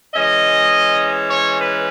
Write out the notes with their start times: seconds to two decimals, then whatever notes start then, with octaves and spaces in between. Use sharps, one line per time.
0.14 E3 G#3 C#4 D#5
1.30 C#5
1.60 B4